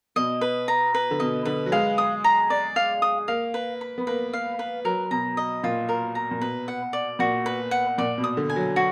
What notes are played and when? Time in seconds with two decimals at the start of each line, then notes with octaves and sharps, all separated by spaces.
0.16 B2 D#5
0.41 B4
0.68 A#5
0.94 B4
1.11 D3
1.20 B2 D#5
1.45 D3 B4
1.66 F#3
1.72 G#3 F5
1.98 D#6
2.24 A#5
2.50 D5
2.76 F5
3.02 D#6
3.28 A#3 F5
3.54 B4
3.81 B5
3.98 B3
4.07 A#3 B4
4.33 F5
4.59 B4
4.85 F#3 A#4
5.11 B2 A#5
5.37 D#5
5.64 A#2 F4
5.89 A#4
6.15 A#5
6.31 A#2
6.41 B2 B4
6.68 F#5
6.93 D5
7.19 A#2 F#4
7.46 B4
7.71 F#5
7.98 A#2 D5
8.18 B2
8.24 D#6
8.37 D3
8.50 G#5
8.56 F#3
8.76 F#4